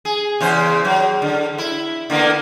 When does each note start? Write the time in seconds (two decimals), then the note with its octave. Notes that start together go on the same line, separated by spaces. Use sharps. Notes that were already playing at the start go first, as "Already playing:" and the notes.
0.05 G#4
0.40 E2 C#3 C5
0.85 F#3
1.22 D3
1.58 E4
2.10 D3 A#3 B3